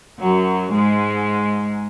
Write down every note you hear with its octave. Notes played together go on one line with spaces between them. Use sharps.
F#2 F#3
G#2 G#3